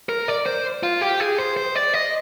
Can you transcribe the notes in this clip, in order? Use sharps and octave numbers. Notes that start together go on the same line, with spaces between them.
A#4
D5
C5
F4
G4
G#4
C5
C5
D5
D#5